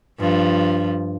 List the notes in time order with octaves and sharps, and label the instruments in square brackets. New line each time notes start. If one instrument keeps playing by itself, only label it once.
[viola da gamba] G2 F3